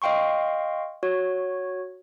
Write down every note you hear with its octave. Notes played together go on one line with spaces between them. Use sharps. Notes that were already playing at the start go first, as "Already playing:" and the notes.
D#5 F5 G5 C6 C#6
F#4 C#5